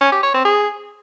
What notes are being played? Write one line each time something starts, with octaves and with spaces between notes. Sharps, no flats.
C#4
G4
C#5
C4
G#4